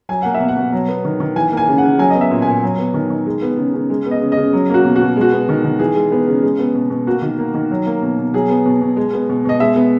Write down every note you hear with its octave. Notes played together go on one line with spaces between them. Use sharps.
F#3 G#5
A#3 F#5
E5
B2
F#5
B2
F#3
B3
D#3
D#3
E3 G#5
A#3
G#5
C#3
F#5
C#3
F#3 G#5
B3 D#5
E5
A#2
A#2 G#5
F#3
B3
D#3
D#3
G#3
B3
C#3
C#3
G#3
B3
D#5
C#3
D#5
C#3
F#3
A#3 F#4
B2
F#4
B2
G#3
F#4
B3
D#3
D#3
E3 G#4
G#3
B3
C#3
G#3
B3
B2
B2
A#3 F#4
D#3
A#3
D#3
F#3
A#3
B2
B2
F#3 G#4
B3
B2
B2
G#3
B3
B2
B2 D#5
G#3 E5
B3